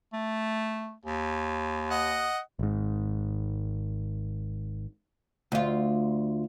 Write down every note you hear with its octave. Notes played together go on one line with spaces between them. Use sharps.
A3
D#2
D#5 F#5
G#1 G#2
D2 F4